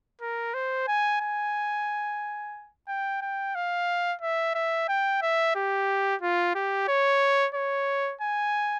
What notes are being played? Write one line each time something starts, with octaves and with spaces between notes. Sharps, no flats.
A#4
C5
G#5
G#5
G5
G5
F5
E5
E5
G5
E5
G4
F4
G4
C#5
C#5
G#5